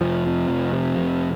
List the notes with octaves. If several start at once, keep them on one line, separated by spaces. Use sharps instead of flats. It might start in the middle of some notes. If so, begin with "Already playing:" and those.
F1 F3
F2
F1
C3
F1